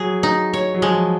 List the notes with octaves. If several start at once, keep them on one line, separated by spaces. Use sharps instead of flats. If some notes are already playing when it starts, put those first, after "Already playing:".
Already playing: F#3 G#4
D#4
C#5
F#3
F3 G#3